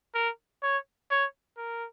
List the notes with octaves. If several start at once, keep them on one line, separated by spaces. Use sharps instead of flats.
A#4
C#5
C#5
A#4